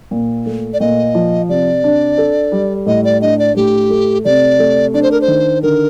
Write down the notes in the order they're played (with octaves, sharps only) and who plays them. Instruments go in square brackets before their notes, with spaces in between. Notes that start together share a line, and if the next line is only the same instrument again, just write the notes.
[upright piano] A#2
A3
[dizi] D5
[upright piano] A#2 [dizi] D#5
[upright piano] F3
[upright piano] C3 [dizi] D5
[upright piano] D4
A4
G3
[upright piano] A2 [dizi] D#5
[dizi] D5
[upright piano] D4 [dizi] D#5
[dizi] D5
[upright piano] A2 [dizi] G4
[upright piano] A3
[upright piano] C3 [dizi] D5
[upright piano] A3
[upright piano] D4 [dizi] D5
[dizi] C5
A#4
C5
[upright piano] D#3
[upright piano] D3 [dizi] A#4